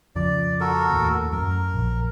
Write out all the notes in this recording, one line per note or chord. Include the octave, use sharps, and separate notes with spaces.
F2 C#3 F3 D5
F#4 A4 A#4
D#2 A2
F#2 A#4
A#1